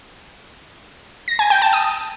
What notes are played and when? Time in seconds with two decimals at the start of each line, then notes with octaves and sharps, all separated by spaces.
1.28 A#6
1.39 G#5
1.50 G5
1.62 A5
1.73 D#6